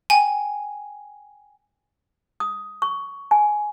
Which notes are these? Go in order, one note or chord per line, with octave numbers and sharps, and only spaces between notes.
G5 G#5
D#6
C#6
G#5